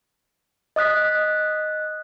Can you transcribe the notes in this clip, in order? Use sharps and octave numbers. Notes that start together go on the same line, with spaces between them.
D#5 D#6 F#6 B6